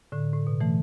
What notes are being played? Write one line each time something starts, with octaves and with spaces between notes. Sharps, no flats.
A2 D3
A2
B2
E3 A3